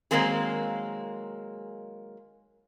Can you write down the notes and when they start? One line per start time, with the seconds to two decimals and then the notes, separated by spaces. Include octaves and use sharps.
0.11 D#3 F#3 G#3 A#3 C4 G#4